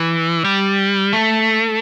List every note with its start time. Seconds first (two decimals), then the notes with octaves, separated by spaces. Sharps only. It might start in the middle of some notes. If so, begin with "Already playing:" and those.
Already playing: E3
0.44 G3
1.13 A3